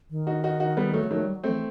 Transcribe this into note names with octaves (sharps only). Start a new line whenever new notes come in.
D#3
D#4 F#4
D#4 F#4
D#4 F#4
G3 B3
F#3 A3
B3
D#3 F#3 A3
G3
F#3
E3 A3 C4